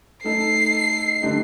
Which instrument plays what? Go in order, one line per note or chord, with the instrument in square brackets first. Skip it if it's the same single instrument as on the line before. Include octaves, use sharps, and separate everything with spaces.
[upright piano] A3 D#4 A4 [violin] C7
[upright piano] D3 A3 D#4 G4